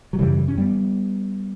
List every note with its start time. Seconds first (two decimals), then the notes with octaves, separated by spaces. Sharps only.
0.13 F#3
0.18 F#2 C#3 E3 G3
0.48 C#4
0.58 G3 B3